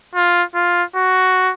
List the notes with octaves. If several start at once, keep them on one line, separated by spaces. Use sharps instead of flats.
F4
F4
F#4